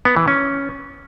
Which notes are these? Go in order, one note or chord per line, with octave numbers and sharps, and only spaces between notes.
B3
E3
C#4